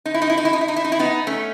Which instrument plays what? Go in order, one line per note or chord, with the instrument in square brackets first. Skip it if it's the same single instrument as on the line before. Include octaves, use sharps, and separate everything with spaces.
[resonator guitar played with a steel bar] D#4
E4
D#4
E4
D#4
E4
D#4
E4
D#4
E4
D#4
E4
B3 D#4
A3 C#4